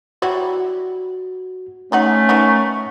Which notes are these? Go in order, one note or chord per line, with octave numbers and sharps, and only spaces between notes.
F#3 G3 E4 F#4
G#3 A3 C#4 D#4 F#5
B3 D#4 A#4 F#5 C#6